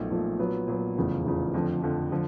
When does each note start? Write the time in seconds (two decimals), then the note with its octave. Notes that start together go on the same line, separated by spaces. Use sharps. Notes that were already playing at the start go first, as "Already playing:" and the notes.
Already playing: B1 A#2 F3 A3
0.10 B1 A#2 F3 A3
0.39 A#2 F#3 B3
0.67 A#2 F#3 B3
0.97 F1 E2 C#3 F3
1.25 F1 E2 C#3 F3
1.54 F2 D3 F3
1.82 F2 D3 F3
2.12 D3 F3